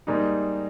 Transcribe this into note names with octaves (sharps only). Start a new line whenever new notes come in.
G#2 G3 A#3 D#4